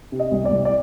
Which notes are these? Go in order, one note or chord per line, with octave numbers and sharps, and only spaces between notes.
C3
D#5
C2
D5
C2
D5